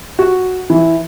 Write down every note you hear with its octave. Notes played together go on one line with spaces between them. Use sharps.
F#4
E3